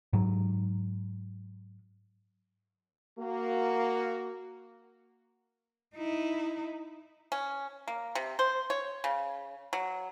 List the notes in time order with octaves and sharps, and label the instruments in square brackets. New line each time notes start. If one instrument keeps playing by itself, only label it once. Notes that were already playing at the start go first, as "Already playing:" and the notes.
[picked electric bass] G#2 F#3
[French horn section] A#3 F#4
[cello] D#4 E4
[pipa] C#4
A#3
C3
C5
C#5
C#3
F#3